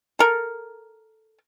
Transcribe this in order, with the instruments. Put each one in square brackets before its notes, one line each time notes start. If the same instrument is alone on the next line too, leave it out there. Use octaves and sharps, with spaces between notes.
[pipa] A4 A#4